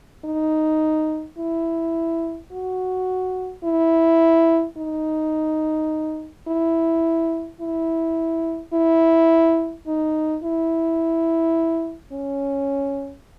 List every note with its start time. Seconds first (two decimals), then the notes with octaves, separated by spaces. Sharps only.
0.25 D#4
1.38 E4
2.52 F#4
3.64 E4
4.77 D#4
6.48 E4
7.61 E4
8.74 E4
9.87 D#4
10.43 E4
12.12 C#4